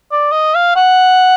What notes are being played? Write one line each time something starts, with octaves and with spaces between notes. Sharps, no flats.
D5
D#5
F5
F#5